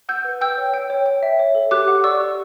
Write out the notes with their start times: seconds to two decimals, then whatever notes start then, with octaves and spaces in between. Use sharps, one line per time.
0.09 F#5 E6 G6
0.24 B4
0.41 G5 E6 G6
0.58 C#5
0.74 G5
0.90 C#5
1.06 G5
1.23 E5
1.39 C#5
1.55 A4
1.71 G4 D6 F#6
1.88 F#5
2.04 D5 C#6 E6
2.20 G4